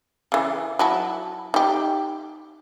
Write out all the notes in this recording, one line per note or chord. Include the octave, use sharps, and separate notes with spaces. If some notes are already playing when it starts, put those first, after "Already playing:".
C#3 E3
F#3 E4 A5
D#4 G4